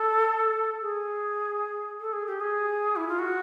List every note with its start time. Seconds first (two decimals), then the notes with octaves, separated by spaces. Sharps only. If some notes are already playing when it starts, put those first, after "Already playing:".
Already playing: A4
0.81 G#4
2.01 A4
2.13 G#4
2.27 G4
2.40 G#4
2.96 E4
3.08 F4
3.19 F#4